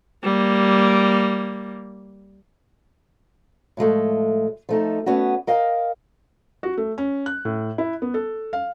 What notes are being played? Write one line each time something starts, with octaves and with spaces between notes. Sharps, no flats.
G3 A#3
A2 F3 G#3 A3
F3 A3 D#4
A3 B3 C#4 F#4
A#4 D#5 F5 G5
F#4
A3
C#4
F#6
A2
E4
B3
A4
F5